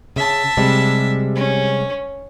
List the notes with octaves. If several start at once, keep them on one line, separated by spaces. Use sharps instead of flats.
C#3 E5 A5
C3 G3 G#3
C#4